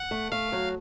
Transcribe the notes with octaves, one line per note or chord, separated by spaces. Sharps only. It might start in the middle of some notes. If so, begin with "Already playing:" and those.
Already playing: F#5
A3
A3 F5
F#3